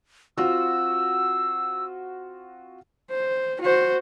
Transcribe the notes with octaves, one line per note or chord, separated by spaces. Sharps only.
C4 F4 F#4 E6
C5
F#4 C5